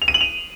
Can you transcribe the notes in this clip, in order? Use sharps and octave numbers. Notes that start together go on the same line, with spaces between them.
F7
D#7
F#7
F7